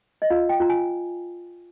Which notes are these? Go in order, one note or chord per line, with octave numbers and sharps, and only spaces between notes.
D#5
F4 F5
G5
F4 A#5
G#5